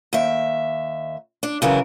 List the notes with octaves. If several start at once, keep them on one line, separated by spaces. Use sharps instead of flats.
D#2 E5
D4
C#3 E3 F#3 A#4